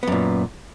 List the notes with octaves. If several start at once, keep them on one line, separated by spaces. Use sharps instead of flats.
F#2 A#2 B3